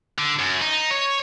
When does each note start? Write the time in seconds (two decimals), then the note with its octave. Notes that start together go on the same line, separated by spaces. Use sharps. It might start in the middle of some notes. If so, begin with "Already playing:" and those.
0.18 D3
0.39 F#2
0.61 D#4
0.90 C#5